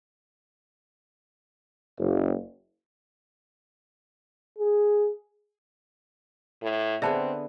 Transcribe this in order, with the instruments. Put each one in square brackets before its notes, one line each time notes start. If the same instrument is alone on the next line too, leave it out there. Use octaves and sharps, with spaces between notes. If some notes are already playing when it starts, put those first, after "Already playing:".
[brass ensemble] F#1
[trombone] G#4
[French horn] A2
[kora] D3 B3 G#4 [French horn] C4 [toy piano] E5 A5